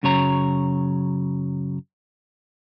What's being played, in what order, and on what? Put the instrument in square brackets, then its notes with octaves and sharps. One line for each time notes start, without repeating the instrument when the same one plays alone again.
[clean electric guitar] F#2 C#3 F#3 C#5 A#5